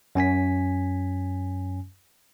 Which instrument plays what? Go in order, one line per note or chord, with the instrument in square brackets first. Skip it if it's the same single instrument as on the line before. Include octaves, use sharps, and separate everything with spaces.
[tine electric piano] F#2 C#4 G#5 B6